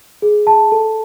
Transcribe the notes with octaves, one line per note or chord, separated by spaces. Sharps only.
G#4
A5
A4